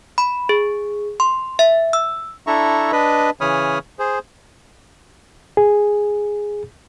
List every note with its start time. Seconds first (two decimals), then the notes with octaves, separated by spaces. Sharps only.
0.18 B5
0.49 G#4
1.20 C6
1.59 E5
1.93 E6
2.47 D4 E4 A4 E5 A#5 C#6
2.92 D4 B4 D#5 B5
3.41 C#3 E3 C#5 B5 D#6 F6
3.99 G#4 C5
5.57 G#4